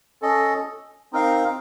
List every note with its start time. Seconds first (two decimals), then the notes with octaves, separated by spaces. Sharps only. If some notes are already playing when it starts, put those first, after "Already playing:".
0.22 C#4 A4 D#5
1.13 C4 D#4 A#4 F5